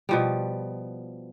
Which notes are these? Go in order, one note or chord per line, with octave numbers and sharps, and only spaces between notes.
B2 F3 G3